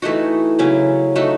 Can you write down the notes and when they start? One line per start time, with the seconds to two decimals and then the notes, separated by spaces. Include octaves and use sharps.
0.02 E3 A3 D#4 F#4
0.59 C#3 F#3 C#4 E4
1.15 A3 D#4 F#4